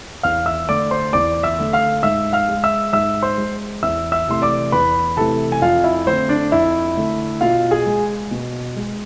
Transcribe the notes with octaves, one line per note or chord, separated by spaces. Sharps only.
E2 F5 F6
E5 E6
D3 A3 D5 D6
C5 C6
E2 D5 D6
E5 E6
D3 A3
F5 F6
G#2 E5 E6
F5 F6
G#3
E5 E6
G#2 E5 E6
C5 C6
G#3
E2 E5 E6
E5 E6
C3 E3 A3 C6
D5 D6
E2 B4 B5
C3 E3 A3 A4 A5
G#5
F2 F4 F5
E4 E5
D3 A3 C4 C5
D4 D5
F2 E4 E5
D3 A3
B2 F4 F5
G#4 G#5
G#3
B2
G#3